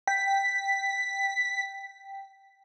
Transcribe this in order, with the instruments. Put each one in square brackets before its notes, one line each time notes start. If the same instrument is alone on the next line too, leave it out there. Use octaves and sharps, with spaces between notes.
[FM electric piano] G5 [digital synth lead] B6